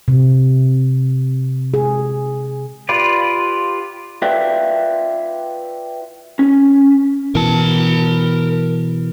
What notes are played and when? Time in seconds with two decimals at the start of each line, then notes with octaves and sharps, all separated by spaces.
0.08 C3
1.74 G#4
2.89 F4 G4 B4 D5
4.22 F4 B4 D5 E5 G5
6.39 C#4
7.35 B2 E3 A#4 A5